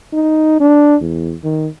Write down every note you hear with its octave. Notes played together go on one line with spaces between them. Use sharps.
D#4
D4
E2
D#3